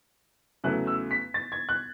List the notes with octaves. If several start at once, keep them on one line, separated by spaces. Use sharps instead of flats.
E2 C#3 F#3 A3 F#6
E6
B6
A6
G#6
F#6